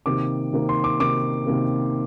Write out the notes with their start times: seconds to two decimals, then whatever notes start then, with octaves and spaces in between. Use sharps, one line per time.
0.06 C3 D#3 A#3 D6
0.53 C3 D#3 A#3
0.69 C6
0.84 D6
0.99 C3 D#3 A#3 D6
1.47 C3 D#3 A#3